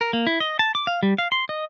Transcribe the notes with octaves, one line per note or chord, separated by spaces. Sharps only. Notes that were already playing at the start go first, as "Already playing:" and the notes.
A#4
A#3
E4
D#5
A5
D6
F5
G3
F5
C6
D#5